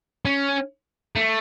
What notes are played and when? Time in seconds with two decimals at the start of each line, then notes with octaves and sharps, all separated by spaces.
0.25 C#4
1.16 A3